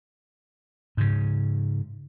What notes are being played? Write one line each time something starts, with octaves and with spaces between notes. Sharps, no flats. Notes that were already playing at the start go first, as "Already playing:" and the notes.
G#2 C#3